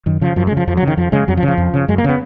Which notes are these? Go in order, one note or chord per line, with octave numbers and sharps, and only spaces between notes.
F#2 D#3
C#3 F3
F#2 F3
G#3
C#3
F3
F2 F3
F#3
C#3
D#3
F2 F3
C#3 G#3
F2 F#3
F3
C#3
F3
F2
C#3
F#2 G#3
A#3
C#3 B3